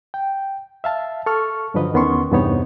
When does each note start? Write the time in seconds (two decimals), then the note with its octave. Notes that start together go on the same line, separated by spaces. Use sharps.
0.14 G5
0.84 E5 F5 A5
1.26 A4 C#6 F6
1.74 G2 D3 F3 F#3 B4 D#5
1.93 E2 D#3 B3 C#4 C6 C#6
2.31 E2 G2 C3 B3 D#4 C#5